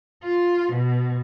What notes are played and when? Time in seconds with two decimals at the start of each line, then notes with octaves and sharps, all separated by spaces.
0.23 F4
0.72 B2